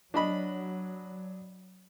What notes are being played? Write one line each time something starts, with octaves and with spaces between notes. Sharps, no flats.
F#3 D4 D#5 B5